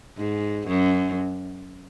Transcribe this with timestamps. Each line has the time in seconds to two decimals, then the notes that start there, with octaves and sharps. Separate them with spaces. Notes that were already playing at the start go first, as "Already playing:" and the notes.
0.17 G#2
0.68 F#2